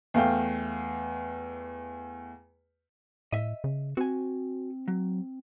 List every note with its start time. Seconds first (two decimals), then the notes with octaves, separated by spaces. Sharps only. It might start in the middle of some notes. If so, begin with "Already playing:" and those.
0.14 E2 A3 F5 G5
3.32 A2 D#5 E5
3.64 C#3
3.97 C4 F#4 G#5
4.88 F#3